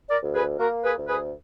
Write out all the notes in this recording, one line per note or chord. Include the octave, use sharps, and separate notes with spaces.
A#4 D5
D2
G#4 B4
A#3 F#4 A#4
G#4 B4
D2
G#4 B4